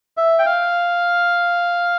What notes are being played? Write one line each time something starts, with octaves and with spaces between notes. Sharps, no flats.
E5
G5
F5